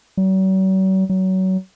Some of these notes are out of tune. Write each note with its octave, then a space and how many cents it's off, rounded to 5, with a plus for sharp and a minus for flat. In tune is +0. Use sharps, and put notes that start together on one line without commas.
F#3 +45
F#3 +25